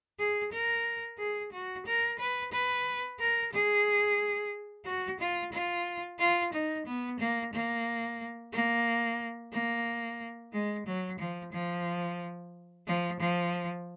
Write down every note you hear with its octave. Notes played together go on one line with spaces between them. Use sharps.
G#4
A#4
G#4
F#4
A#4
B4
B4
A#4
G#4
F#4
F4
F4
F4
D#4
B3
A#3
A#3
A#3
A#3
G#3
F#3
F3
F3
F3
F3